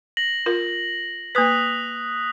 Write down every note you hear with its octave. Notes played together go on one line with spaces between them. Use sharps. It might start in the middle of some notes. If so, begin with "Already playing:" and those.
A#6 F#7
F4 A#4
A#3 B4 D#6 F#6 B6